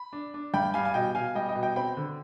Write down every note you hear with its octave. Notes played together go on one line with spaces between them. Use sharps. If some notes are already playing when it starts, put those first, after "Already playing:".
Already playing: B5
D4
D4
G2 G5 B5
G3 F5 G#5
G#5
B2 D#5 G5
B2 F5 G#5
G3 D#5 G5
D#5 G5
B2
D#5 G5
C4 G5 B5
D3